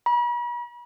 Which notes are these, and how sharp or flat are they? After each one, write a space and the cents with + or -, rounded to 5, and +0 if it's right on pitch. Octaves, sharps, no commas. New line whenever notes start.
B5 -45